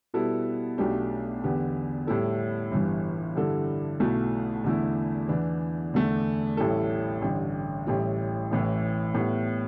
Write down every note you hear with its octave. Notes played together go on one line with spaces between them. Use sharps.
B2 G3 B3 E4 A4
B1 B2 A3 D4 G4
E2 D3 B3 G4
A2 G3 E4 A4
G1 G2 E3
G2 D3 G3 E4 A4
B1 B2 A3 E4
E2 D3 A3 E4
E2 E3 B3 D4
E2 D3 A3
A1 A2 G3 E4 A4
A1 G2 D3
A1 A2 G3 E4
A1 A2 E3
A2 G3 B3